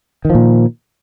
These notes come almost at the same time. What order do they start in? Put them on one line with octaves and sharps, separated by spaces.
D#3 F3 A#2